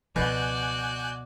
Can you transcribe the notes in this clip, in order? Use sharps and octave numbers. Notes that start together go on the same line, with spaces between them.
C#2 B2 F3 F#4 D5 G#5 F#6 G6